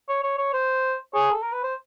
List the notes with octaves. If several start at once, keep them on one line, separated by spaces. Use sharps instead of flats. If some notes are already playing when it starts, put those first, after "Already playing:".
C#5
C#5
C#5
C5
G#4 C#5
A4
A#4
B4
C5